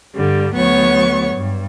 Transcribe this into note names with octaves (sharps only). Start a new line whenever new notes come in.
G2 D3 G3
D2 F#3 B3 C#5 C#6
G2